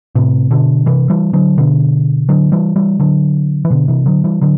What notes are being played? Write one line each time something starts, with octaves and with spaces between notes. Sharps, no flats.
A2 C3
B2 D3
C3 E3
E3 G3
D3 F#3
B2 D3
D3 F#3
E3 G3
E3 G3
D3 F#3
E3
B2 D3
C3 E3
D3 F#3
E3 G3
D3 F#3